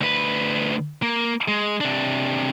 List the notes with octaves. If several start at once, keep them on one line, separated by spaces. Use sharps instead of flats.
D2 B4
A#3
G#3
C3 D4